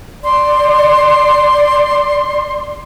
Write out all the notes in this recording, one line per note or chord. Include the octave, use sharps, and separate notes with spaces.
D5 C6